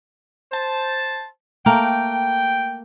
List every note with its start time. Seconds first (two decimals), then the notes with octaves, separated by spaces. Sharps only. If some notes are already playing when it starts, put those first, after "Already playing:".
0.52 C5 A5
1.66 A3 A#3 A#4 G5